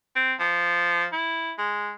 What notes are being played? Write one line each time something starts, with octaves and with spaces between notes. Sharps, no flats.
C4
F3
E4
G#3